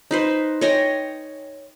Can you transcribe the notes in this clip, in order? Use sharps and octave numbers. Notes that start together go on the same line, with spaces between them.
D#4 B4 C5
C#5 D#5 G5 G#5